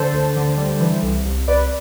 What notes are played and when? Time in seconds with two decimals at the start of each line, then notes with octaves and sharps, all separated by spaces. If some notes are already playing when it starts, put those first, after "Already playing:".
Already playing: D3 A4 C5
0.13 D2
0.36 D3
0.57 G3
0.80 E3
1.03 C2
1.25 C2
1.48 C2 B4 D5